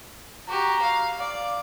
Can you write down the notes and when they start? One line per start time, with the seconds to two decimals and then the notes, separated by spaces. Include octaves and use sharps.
0.48 F#4 G4 A#5
0.82 F5
1.19 D5 F5